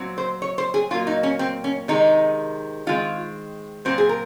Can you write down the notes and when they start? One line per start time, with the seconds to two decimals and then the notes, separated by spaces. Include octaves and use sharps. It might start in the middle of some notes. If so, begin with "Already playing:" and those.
Already playing: A#2 F#3 C4
0.18 C5
0.42 C#5
0.58 C5
0.74 G#4
0.90 A#2 F#3 A#3 F4
1.07 D#4
1.23 C#4
1.39 C4
1.64 C#4
1.88 C3 D#3 G#3 D#4
2.87 D#3 G#3 C4 F4
3.85 A#2 F#3 C4 C5
3.98 G#4
4.09 A#4